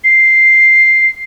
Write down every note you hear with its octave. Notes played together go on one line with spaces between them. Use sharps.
C7